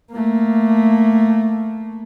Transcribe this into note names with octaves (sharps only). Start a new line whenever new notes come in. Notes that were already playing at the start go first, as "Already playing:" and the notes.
A3 A#3